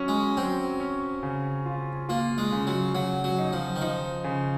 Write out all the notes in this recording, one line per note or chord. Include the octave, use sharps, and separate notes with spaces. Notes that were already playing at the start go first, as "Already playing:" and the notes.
Already playing: F#3 C#4
G#3
F#3 C4
C#4
C#3
F4
A#3 F4
G#3
C#3
F#3
C#3 F#3
F#3
D#4
F3
D#3
F3 D#4
C#3